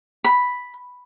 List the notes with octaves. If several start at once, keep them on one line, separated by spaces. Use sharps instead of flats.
B5